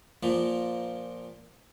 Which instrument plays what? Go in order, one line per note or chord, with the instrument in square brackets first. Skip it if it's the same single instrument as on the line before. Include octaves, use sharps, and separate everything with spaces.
[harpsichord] A#2 F3 A#3